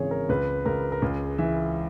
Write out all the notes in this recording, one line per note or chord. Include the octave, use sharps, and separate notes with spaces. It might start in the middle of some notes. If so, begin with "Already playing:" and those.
Already playing: G#1 C#3 E3 G#4 C#5
A#4
C#2 B4
C#2 A#4
A#4
C#2 G#4
E3 E5